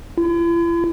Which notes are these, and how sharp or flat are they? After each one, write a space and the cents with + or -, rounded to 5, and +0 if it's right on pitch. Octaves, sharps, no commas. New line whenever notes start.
E4 +45